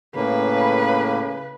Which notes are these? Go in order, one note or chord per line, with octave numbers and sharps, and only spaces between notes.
A2 C#3 A#3 B4